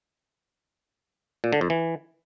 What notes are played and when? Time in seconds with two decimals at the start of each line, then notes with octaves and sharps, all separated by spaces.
1.44 A#2
1.53 D3
1.61 F2
1.70 E3